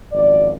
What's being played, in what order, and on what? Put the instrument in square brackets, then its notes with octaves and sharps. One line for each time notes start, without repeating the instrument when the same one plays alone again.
[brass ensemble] G#1 F#2 F3 D5